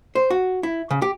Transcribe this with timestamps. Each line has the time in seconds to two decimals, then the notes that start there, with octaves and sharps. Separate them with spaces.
0.15 C5
0.30 F#4
0.63 E4
0.91 C#3
1.02 G4